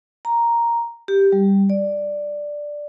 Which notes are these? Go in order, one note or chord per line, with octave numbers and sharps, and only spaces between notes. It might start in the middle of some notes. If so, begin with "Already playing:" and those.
A#5
G4
G3
D5